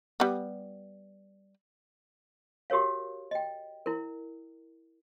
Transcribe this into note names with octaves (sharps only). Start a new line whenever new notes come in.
G3 B3
F#4 G4 A#4 C#5 F5
D#5 G5
E4 A#4